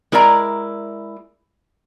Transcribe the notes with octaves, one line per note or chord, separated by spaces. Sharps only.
G#3 E4 A#4 D5 E5 A#5